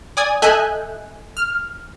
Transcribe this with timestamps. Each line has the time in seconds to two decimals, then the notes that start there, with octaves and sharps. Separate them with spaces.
0.17 D5 G#5 D#6 G#6
0.42 A4 D#5 E5 G#5 F#6 G6
1.37 F6